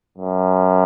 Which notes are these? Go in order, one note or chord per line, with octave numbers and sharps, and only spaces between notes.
F#2